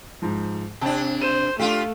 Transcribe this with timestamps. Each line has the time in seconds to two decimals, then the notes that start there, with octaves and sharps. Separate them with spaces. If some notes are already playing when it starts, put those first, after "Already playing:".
0.22 G#2 F3
0.81 C3 D4 G5 A5
1.21 C5 D#7 E7
1.59 A3 D4 F4 G4 F5